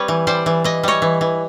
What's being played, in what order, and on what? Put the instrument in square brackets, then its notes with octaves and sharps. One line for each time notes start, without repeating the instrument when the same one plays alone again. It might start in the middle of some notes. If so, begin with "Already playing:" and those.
Already playing: [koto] G3 C4 B4 C#5
E3
G3 C5 D5
E3
E3 D#5
G3 C#5 D#5
E3
E3